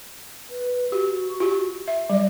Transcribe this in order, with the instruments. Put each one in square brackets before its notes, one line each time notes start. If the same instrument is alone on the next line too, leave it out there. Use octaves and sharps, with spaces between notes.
[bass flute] B4
[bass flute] F#4 [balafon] G4
[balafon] F4 G4
E5
[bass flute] F#3 [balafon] G3 D5